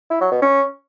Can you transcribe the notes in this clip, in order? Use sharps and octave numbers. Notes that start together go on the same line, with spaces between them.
E4
F#3
B2
C#4